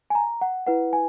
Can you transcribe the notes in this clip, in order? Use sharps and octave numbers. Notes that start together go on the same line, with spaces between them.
G#5
A#5
F#5
E4 B4 F#5
G#5